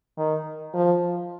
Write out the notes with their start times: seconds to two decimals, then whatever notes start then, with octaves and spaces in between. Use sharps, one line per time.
0.18 D#3
0.74 F3